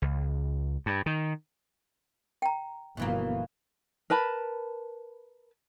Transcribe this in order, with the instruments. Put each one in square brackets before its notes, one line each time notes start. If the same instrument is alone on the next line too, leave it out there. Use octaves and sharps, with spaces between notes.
[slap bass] C#2
G2
D#3
[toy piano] G5 A#5
[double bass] G1 F3 [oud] B2 E3 A#3
[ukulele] A#4 B4 A5 B5